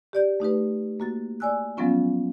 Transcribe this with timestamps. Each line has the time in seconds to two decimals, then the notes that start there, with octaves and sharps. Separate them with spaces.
0.13 G4 D5 G6
0.40 A3 D#4 G4 B4
1.00 A#3 F#4 A6
1.40 C#5 D5 G#5 E6 F#6
1.77 F3 F#3 G#3 B3 C#4 F4